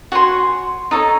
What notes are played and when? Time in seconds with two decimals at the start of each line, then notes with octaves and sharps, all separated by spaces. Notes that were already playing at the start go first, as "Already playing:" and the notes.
0.12 F#4 C#5 G#5 C6
0.91 D#4 A4 C#5